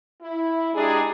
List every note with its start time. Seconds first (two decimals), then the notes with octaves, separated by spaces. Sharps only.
0.22 E4
0.74 G#3 D4 D#4 G4 G#4